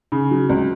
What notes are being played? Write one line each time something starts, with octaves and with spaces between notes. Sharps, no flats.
C#3
F#3
C#2